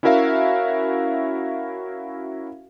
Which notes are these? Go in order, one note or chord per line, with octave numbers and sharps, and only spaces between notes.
C#4 E4 F#4 A#4 E5 F5